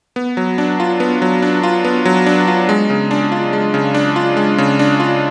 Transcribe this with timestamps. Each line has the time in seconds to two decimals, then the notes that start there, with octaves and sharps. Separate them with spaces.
0.16 B3
0.37 F#3
0.58 D4
0.80 F4
1.00 B3
1.22 F#3
1.42 D4
1.63 F4
1.85 B3
2.05 F#3
2.26 D4
2.47 F4
2.69 G#3
2.90 C#3
3.11 D4
3.32 F4
3.53 G#3
3.74 C#3
3.94 D4
4.16 F4
4.37 G#3
4.58 C#3
4.79 D4
5.00 F4